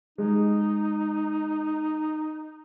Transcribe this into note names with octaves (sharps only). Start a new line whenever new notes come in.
G#3 D#4